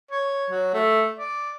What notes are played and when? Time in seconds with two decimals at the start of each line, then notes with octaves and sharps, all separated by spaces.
0.11 C#5
0.50 F#3
0.74 A3
1.19 D5